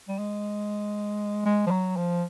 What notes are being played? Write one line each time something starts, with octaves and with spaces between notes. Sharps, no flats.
G3
G#3
G#3
F3
F#3
F3